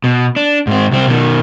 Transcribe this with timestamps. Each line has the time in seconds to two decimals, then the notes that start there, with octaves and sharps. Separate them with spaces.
0.04 B2
0.36 D4
0.67 G#2 C4
0.91 C2 C4
1.07 B2 D#3